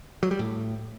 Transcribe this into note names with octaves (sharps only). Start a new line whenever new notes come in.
F#3
G3
A2